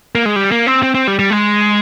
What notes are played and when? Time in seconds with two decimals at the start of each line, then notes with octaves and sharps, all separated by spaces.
0.15 A#3
0.25 G#3
0.36 G3
0.52 A#3
0.67 C4
0.83 C4
0.94 C4
1.07 G3
1.19 G3
1.30 G#3